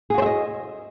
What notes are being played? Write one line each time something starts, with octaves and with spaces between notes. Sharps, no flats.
F#4 G#4 C5 D#5 E5